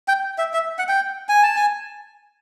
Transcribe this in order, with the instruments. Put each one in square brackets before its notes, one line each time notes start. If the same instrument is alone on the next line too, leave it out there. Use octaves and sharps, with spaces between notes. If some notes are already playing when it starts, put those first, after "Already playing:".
[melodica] G5
E5
E5
F#5
G5
G#5
A5
G#5